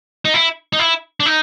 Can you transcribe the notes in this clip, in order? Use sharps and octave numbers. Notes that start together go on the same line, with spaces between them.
D#4
E4
D#4
E4
D4
D#4